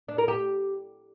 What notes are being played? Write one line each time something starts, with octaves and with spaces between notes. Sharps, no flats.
D4
A#4
G4